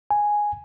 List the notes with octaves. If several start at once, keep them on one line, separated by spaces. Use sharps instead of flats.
G#5